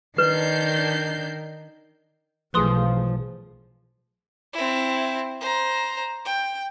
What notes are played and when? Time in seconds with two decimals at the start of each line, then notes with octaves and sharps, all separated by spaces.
0.18 D#3 D4 B4 G6 C7
2.54 B1 E3 F3 A3 G#4 B4 C6 D#6
4.53 C4 E4
5.41 C5 A#5
6.25 G5